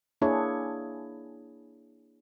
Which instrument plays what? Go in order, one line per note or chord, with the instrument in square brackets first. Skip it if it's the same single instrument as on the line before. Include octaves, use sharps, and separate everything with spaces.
[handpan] A#3 D4 E4 G#4 C#5